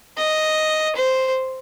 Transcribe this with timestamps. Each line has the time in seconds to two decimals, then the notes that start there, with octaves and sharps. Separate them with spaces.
0.18 D#5
0.96 C5